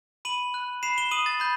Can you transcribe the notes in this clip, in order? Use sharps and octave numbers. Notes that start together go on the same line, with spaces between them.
B5 D#7 F#7
F#6
B5 C7 E7
E7 G7
D#6 D#7 F#7
A6
B5 G6